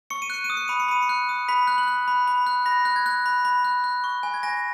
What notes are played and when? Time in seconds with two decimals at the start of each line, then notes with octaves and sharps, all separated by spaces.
0.10 C#6 C#7
0.22 D#7
0.30 F#6 C#7
0.44 D#7
0.50 D#6
0.57 C#7
0.68 B5 D#7
0.80 C#7
0.88 B5 D#7
1.02 C#7
1.09 F#6
1.29 D#6
1.48 B5 B6
1.67 F#6
1.78 F#7
1.88 F#6
2.08 B5
2.27 B5
2.47 F#6
2.66 B5 A#6
2.85 F#6
2.96 G#6
3.06 F#6
3.26 B5
3.45 B5
3.64 F#6
3.84 F#6
4.04 C#6
4.23 G#5
4.34 G#6
4.43 G#5 A#6